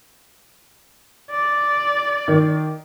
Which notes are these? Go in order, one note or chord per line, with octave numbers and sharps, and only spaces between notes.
D5
D#3